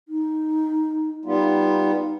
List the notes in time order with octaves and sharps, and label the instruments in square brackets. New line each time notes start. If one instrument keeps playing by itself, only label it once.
[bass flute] D#4
[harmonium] G3 B3 F4 [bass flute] D#4